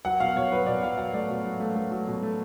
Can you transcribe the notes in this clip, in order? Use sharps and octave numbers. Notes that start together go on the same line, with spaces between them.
F#3 F#5
B2 F5
B2 C#5
F#3 B4
B2 D5
F#3 F5
F#3 F#5
A3 D5
B2
F#3
A3
A3
F#3
B2
A3